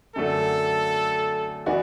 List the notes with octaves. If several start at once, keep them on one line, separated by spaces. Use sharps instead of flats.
F#2 D3 F#3 A3 D4 A4
E3 B3 F#4 B4 D5